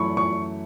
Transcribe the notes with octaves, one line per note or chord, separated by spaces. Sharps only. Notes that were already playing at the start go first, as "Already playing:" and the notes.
Already playing: F#2 E3 A3 E4 B5 C#6
C#6